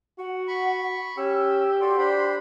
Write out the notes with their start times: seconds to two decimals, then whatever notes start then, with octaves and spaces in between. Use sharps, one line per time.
0.18 F#4 F#5
0.48 B5 C#6
1.17 C#4 G4 E6
1.81 F#4 A4 D5 C6
1.98 D4 C5 B5